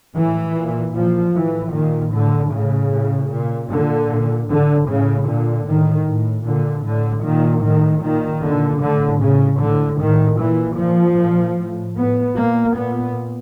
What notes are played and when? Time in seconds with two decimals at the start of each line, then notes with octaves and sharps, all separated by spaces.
0.15 A2 E3
0.56 A#2
0.94 A#2 F3
1.34 A2 E3
1.73 A#2 D#3
2.13 A2 D3
2.52 A2 C#3
2.91 A2
3.31 A#2
3.70 A#2 D3
4.10 A#2
4.49 A2 D3
4.88 A2 C#3
5.28 A#2 D3
5.67 A2 D#3
6.07 A2
6.46 A#2 D3
6.85 A2 D3
7.25 A#2 D#3
7.64 A2 D#3
8.03 A#2 D#3
8.43 A#2 D3
8.82 A2 D3
9.21 A2 C#3
9.61 A2 D3
10.00 A2 D#3
10.40 A#2 E3
10.79 A#2 F3
11.19 A#2
11.58 A2
11.97 A2 B3
12.37 A#2 A#3
12.76 A#2 B3